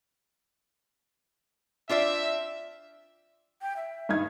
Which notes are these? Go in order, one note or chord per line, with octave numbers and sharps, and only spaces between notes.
C4 D4 F4 D5 E5
G5
E5
G2 D#4 G#6